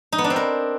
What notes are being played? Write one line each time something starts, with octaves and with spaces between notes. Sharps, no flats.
D#4
B3
D4
C4
A#4